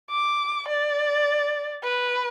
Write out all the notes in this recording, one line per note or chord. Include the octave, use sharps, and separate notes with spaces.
D6
D5
B4